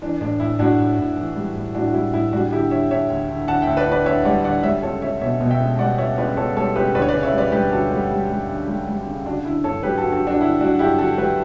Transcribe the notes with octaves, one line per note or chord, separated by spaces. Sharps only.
E3 D4
A2 D4
A2 E4
A2 D4 F#4
A2
A2
E3
G3
A2
A2 D4 F#4
F#4
G3 E4
A2 E4
G3 D4 F#4
D3 E4 G4
D3 C#5 E5
D3 C#5 E5
D2
D3
D3 F#5 A5
E5 G5
D2
B4 D5
D2
B4 D5
D2 C#5 E5
G3 D5 F#5
D3 D5 F#5
G3 C#5 E5
C#2 A4 C#5
C#2 C#5 E5
B2 C#5 E5
B2
E5 G5
C#2
G3 D5 F#5
C#2 C#5 E5
C#2 B4 D5
C#2 A4 C#5
G3 A4 C#5
C#2 G4 B4
D2 B4 D5
C#5
B4 D5
C#3
C#5 E5
G3 B4 D5
G3 G4 B4
D2 F#4 A4
G3
G3
G3
D2
G3
G3
C#3
D3 D4 F#4
D3 E4
G2 A4 C#5
F#3 G4 B4
F#4 A4
G2
F#4 A4
G2 D4 F#4
D3 E4
F#3 D4 F#4
G2 E4 G4
D3 F#4 A4
F#3 G4 B4